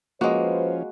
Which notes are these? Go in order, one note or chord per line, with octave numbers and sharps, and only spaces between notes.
F3 G#3 A#3 C#4 F#4 B4 C5